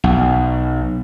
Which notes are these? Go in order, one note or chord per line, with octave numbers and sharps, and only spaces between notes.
B1